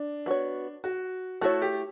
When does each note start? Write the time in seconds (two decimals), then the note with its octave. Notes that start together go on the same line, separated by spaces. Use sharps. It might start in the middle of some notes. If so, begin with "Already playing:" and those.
Already playing: D4
0.26 B3 F#4 C#5
0.84 F#4
1.41 A3 E4 F#4 A4 C#5
1.62 G4